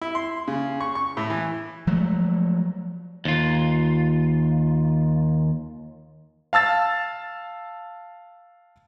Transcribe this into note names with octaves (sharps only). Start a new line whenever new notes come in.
E4
C6
C#3
C#6
C#6
A2
E3
F3 F#3 G#3 A3
D#2 F4
F5 A5 E6 A6